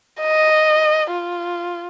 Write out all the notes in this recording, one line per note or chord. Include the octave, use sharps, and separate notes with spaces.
D#5
F4